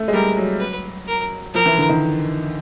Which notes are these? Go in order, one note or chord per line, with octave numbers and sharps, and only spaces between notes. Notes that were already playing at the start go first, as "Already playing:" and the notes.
Already playing: A3
G#3
G3 A#4
F#3
B4
A#4
F3 A#4
E3
D3
D#3